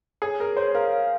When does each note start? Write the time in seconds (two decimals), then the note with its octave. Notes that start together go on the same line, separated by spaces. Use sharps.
0.22 G#4 C#5
0.40 G#4 A#4
0.57 C5 C#5
0.75 A#4 F5
0.92 F5